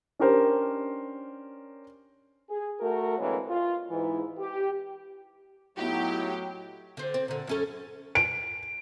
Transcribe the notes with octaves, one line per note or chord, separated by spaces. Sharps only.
C#4 D4 G4 A#4 C5
G#4
A3 F#4 A#4
D3 E3 G#3 A#3 C4 C#5
F4
G#2 E3
G4
A2 F#3 B3 D#4 E4 F#4 G4
D3 C5
C4
A#2 D3
F#2 C#4 A4
D7